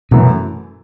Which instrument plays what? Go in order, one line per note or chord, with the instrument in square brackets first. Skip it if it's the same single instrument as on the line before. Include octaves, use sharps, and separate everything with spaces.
[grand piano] F#2 E3 A3 [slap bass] B2